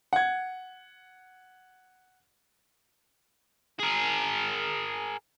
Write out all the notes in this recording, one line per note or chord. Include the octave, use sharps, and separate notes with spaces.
F#5 G#6
G#4 A#4